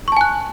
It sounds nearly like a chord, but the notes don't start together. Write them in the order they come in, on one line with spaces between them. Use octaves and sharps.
C#6 A5 G#5 F#6